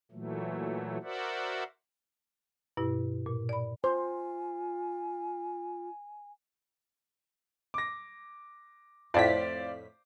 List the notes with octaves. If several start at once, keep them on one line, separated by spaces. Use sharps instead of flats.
A#2 E3 F#3 A3
F#4 A#4 C5 D5 E5 F#5
G2 B2 E4
A#2
D5 B5
F4 C5 G#5
D6 A#6
F2 A2 C5 D5 F5 B6